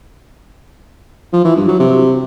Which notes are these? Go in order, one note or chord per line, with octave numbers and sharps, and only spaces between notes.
F3
E3
G2
F#3
C3